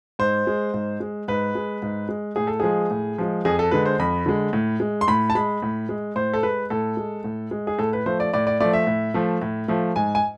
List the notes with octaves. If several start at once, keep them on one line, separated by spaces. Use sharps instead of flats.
G#2 C5
G#3
G#2
G#3
G#2 B4
G#3
G#2
G#3
A2 G#4
A4
F3 G#3 G#4
A2
F3 G#3
F2 G#4
A4
D3 G#3 B4
C5
F2 B5
D3 G#3
A2
G#3
C6
A2 B5
A5
G#3 B5
A2
G#3
A2 C5
A4
G#3 B4
A2 A4
G#3
A2
G#3
G#4
A2 A4
B4
F3 A3 C5
D5
A2 D5
D5
F3 A3 D5
E5
A2
F3 A3
A2
F3 A3
G#2 G#5
G#5